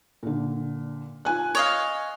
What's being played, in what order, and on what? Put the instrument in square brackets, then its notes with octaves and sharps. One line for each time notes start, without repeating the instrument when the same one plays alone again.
[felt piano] A#2 D3
F4 G#5 F#6
[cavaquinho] C#5 D#5 F5